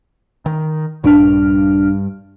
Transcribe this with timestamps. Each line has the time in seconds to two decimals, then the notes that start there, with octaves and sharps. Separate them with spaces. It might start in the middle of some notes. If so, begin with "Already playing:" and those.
0.46 D#3
1.04 A#1 G2 G3 D4 F6